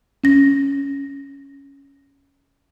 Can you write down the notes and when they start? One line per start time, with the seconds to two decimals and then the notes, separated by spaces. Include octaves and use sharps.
0.24 C#4 A#6